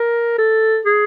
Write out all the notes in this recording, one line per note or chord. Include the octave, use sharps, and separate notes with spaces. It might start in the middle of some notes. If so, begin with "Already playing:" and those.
Already playing: A#4
A4
G#4